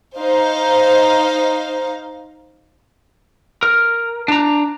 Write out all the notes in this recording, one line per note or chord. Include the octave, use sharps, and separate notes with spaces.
D#4 C5 F5
A#4
D4 A#5